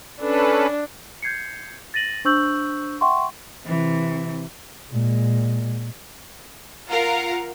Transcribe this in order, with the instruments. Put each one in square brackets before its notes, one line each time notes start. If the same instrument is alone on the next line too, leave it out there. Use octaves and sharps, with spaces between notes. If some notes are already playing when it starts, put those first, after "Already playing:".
[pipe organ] C#4 A4 B4 [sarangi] D4
[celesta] G6 G#6 C7 C#7
A6 A#6 D#7 F#7
D4 C5 C#6 E6 G6 F#7
E5 F#5 G5 C6 C#6
[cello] C3 E3
[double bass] A#2 G#3
[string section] F4 A#4 F5 F#5 A#5